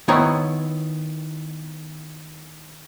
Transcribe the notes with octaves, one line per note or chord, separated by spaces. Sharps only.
D#3 B3 E4 C#5 A#5